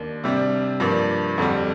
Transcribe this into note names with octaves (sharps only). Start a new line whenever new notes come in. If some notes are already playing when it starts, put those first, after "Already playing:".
Already playing: D#2 A#3 D4
C3 G3 D4
G2 F3 A#3 D4
F2 D3 G3